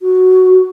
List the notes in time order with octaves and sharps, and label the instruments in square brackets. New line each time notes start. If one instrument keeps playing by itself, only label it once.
[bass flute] F#4